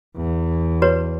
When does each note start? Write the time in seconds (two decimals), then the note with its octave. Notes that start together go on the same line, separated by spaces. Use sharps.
0.17 E2
0.82 F#4 B4 C#5